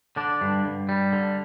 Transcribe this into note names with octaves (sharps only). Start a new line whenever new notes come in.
D3 D4
G2
G2
G3
D3